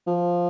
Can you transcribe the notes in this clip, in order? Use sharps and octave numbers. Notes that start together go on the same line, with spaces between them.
F3